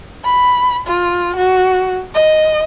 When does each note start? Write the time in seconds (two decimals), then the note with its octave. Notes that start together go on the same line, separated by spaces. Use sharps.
0.25 B5
0.87 F4
1.36 F#4
2.15 D#5